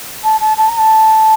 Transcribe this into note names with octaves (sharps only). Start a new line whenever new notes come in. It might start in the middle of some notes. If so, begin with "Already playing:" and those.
A5
A5
A5
A#5
A5